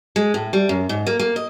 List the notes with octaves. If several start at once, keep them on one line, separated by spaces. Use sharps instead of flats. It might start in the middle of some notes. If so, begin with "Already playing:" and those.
G#3
A2
G3
F#2
G#2
A#3
A#3
D#5